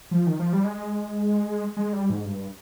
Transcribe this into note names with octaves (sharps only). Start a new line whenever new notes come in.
F3
D#3
F3
G3
G#3
G#3
G3
G#2
G2